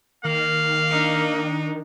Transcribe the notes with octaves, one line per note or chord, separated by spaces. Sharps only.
D#3 A#3 F5
D4 D#4